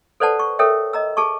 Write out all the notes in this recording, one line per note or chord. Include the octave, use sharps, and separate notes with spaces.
A4 B4 C5 D5 F#5 A5
C#6
A4 A#4 C#5 E5 G5
D#5 A#5 E6
G#4 A5 C#6